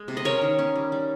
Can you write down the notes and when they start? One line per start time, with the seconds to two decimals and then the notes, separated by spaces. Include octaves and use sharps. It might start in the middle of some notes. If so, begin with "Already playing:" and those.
Already playing: G#3
0.08 C3
0.17 D#5
0.25 C#4 A#4 C#5
0.42 D#3
0.59 C#4
0.76 G3
0.92 G3